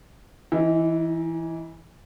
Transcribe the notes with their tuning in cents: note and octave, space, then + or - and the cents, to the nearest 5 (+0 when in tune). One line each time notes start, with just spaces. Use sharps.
E3 +0 D#4 +35